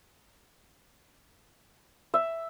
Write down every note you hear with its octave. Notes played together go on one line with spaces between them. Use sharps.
E5